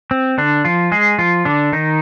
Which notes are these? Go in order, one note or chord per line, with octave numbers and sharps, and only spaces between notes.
C4
D3 D4
F3 F4
G#3 G#4
F3 F4
D3 D4
D#3 D#4